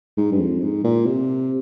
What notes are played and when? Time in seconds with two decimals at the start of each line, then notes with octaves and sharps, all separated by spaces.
0.18 G#2
0.32 G2
0.39 F2
0.62 G#2
0.84 A#2
1.06 C3